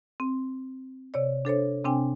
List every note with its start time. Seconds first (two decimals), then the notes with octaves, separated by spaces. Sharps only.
0.20 C4
1.14 C3 C#5 D5
1.45 D4 A4 C5 C#5
1.84 C3 C4 D4 G5 G#5